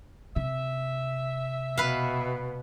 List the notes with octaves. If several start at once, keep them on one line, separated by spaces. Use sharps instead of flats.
C3 E5
B2 B4 F5